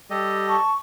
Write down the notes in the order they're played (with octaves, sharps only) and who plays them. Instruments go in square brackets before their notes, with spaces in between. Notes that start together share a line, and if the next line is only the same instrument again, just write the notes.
[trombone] G3 [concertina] G4 A4 D#5
[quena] A5 [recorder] C#6